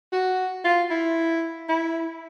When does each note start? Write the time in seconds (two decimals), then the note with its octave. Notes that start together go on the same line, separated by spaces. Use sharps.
0.12 F#4
0.64 F4
0.90 E4
1.69 E4